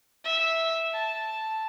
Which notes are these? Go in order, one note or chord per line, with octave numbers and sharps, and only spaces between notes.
E5
A5